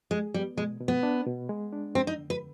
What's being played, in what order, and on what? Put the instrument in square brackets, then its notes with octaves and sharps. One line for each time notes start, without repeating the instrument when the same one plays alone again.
[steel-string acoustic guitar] G#3 [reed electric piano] G#4
[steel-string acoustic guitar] G3 [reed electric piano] B3
[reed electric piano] B2 [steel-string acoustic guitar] G#3
[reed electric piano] B2
[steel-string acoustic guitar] B3
[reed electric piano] D4
B2
G#3
D4
[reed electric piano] F2 [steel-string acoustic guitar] C4
[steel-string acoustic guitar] D#4
[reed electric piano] D3
[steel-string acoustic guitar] B4